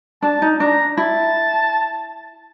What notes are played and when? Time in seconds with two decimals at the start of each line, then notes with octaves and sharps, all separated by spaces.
0.22 D4 A5
0.42 D#4
0.60 D4 A#5
0.97 E4 A5